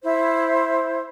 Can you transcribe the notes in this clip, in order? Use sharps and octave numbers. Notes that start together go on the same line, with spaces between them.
E4 C5